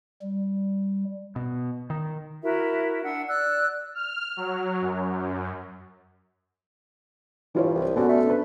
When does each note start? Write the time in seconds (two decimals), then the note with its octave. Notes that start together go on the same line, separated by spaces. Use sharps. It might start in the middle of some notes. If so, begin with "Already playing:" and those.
0.22 G3
1.36 B2
1.90 D#3
2.43 E4 F#4 A#4 E5
3.04 D4 F#5 E6
3.27 D5 E6 F#6
3.95 F6
4.37 F#3
4.81 F#2
7.55 G2 E3 F4 C#5
7.74 C2
7.96 D3 B3 C#4 F#4
8.09 A3
8.26 D4 B4